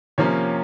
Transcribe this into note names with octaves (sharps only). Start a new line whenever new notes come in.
C3 F3 A#3 C#4 C#5